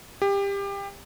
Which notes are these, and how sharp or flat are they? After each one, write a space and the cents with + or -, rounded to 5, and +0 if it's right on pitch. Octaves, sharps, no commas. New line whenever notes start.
G4 +25